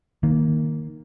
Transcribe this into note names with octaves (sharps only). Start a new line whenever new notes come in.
D#3 A#3